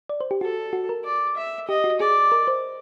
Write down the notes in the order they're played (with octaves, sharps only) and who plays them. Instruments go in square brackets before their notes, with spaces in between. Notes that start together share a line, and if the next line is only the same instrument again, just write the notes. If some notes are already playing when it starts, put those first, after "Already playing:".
[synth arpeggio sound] D5
C5
G4
[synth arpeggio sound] F#4 [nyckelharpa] A4
[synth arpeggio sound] F#4
A#4
[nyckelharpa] D5
E5
[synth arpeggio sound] G4 [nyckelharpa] D#5
[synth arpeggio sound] F#4
[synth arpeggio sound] G#4 [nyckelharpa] D5
[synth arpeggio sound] A#4
C5